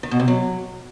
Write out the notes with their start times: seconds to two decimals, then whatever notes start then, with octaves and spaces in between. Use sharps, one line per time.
0.03 D#3
0.11 B2
0.20 C3
0.28 F#3